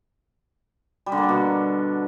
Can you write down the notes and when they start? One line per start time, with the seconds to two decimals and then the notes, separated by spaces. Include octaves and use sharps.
1.06 G3
1.12 D3
1.18 A#3
1.23 G3
1.29 B2